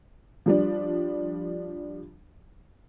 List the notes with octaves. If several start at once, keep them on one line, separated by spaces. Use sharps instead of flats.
F3 G3 D4